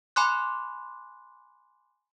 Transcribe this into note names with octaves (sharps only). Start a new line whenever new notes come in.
G#5 B5 C6 D6 F#6